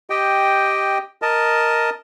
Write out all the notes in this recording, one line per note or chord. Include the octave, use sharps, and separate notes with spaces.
G4 D#5 G5
A#4 D#5 A5